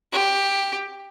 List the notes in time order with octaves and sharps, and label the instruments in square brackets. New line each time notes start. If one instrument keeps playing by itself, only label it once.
[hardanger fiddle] G4